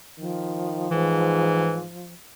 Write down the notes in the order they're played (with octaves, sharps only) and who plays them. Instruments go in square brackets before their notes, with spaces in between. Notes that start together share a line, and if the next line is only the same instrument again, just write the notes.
[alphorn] D#3 [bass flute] F3
[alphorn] G#2 [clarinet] E3